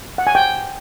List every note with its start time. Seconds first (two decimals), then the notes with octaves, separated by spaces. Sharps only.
0.18 F#5
0.27 G#5
0.35 G5